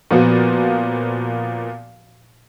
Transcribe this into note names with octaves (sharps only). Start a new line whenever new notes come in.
A#2 F3 B3 F#4